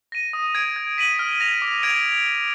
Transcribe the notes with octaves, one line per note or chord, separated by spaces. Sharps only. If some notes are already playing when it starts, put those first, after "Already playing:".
A#6 D#7
D#6
G#6 D7
G#6
B6 D#7 F#7
F6
A#6 F7
D6
G#6 D7 F7